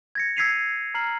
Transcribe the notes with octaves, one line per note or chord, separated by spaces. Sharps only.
G#6 A#6 C#7
E6 G#6 B6 C7 D#7 F7
A#5 F6 C7 F#7